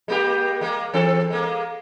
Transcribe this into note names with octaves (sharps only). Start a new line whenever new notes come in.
G#3 A#3 G4
G#3 A#3
E3 C4 A4
G#3 A#3